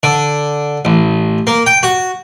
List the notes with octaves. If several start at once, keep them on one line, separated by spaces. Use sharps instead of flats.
D3
A1
A#3
G5
F#4